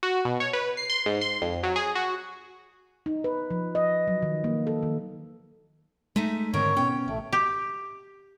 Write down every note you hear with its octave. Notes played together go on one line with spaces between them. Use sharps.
F#4
B2
C#5
B4
C7
C6
G#2
C6
F2
F#3
G#4
F#4
D#4
B4
F3
D#5
F#3
D#3
A#3
A4
D#3
G#3 A3 D#4 E5
G#2 D3 D#3 C4 A#4 C#5 G5
B2 B3 C#4 G5
A1 A3
G4